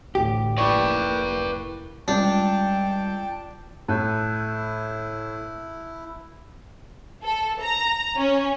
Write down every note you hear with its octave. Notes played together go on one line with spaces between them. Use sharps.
A1 D2 G4
F1 A#3 E4 B4 D5 G5 C#6
C#2 G3 D4 G5 A5
A2 E4 A5 F#6 G6
A4
A#5
C#4